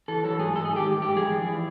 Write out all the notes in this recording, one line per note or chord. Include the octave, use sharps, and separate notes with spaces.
E3 A4
F#3 A4
G#2 G#4
G#2 A4
D#3 G#4
G4
G#2
G#2 G4
F3 G#4
F3
E3